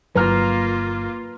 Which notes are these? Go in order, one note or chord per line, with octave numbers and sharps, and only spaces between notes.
G1 F#3 A#3 F4 B4 A#5 F6